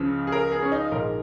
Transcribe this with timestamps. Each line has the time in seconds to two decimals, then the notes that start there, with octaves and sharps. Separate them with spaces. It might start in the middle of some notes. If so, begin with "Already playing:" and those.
Already playing: C#2 C#3 F3
0.27 G#4
0.32 A#4
0.52 G#4
0.62 C#4
0.72 D#4
0.92 A#1 G#2 F3 G#3 A#4